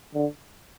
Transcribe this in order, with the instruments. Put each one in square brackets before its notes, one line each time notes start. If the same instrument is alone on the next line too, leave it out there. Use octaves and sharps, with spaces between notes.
[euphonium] D3